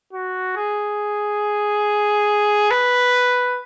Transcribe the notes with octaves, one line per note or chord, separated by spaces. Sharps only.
F#4
G#4
B4